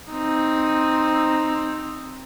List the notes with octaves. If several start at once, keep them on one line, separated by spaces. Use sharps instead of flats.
C4 D#4